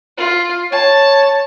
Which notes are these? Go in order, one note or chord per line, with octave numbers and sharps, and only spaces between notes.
F4
C#5 A5